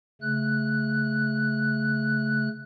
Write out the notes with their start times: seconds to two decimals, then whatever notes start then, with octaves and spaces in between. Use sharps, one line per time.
0.21 C#3 A3 F#6